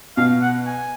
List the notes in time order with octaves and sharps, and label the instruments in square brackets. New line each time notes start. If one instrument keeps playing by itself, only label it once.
[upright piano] B2 [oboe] F5
[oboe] F#5
G#5